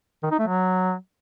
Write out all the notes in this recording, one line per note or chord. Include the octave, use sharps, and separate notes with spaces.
D#3
D#4
A3
F#3